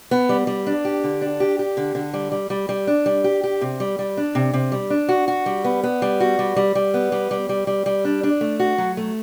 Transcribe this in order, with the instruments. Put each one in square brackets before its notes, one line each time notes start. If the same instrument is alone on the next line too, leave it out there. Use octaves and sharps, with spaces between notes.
[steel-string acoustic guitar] B3
G3
G3
D4
G4
D3
D4
G4
G4
D3
D3
G3
G3
G3
G3
D4
G3
G4
G4
C3
G3
G3
D4
C3
C3
G3
D4
F#4
F#4
G3
B3
B3
G3
F#4
G3
G3
G3
B3
G3
G3
G3
G3
G3
D4
D4
A3
F#4
F#3
A3